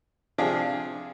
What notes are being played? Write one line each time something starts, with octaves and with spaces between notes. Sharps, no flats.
C3 F3 D4 F4 G#4